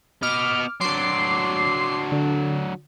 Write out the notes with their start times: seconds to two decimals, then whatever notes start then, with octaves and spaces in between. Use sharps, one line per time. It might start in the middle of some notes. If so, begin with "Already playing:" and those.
0.22 B3 D#5 D6 F6
0.80 F#3 D4 C6 D6 C7
2.12 D3